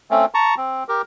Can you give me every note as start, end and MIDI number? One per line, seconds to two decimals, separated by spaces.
0.11 0.25 57
0.11 0.25 60
0.11 0.25 61
0.34 0.55 81
0.34 0.55 82
0.34 0.55 85
0.57 0.84 60
0.88 1.02 67
0.88 1.02 70